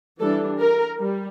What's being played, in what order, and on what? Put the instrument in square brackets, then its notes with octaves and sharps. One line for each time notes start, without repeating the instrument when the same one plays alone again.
[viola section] E3 G3 D4 A4
A#4
G3